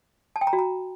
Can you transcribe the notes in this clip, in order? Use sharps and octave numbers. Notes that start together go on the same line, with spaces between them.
A5
G5
A#5
F#4
A#5